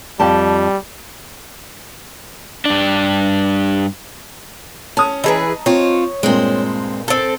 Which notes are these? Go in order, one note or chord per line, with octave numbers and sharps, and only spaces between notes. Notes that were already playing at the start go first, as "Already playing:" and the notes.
F2 G3 G5 A5
G2 D4
C#4 A5 D#6
E3 G#4 B4 D#5 A5 A#5
C4 F4 C#5
G2 A#2 G#3 C4
C4 A4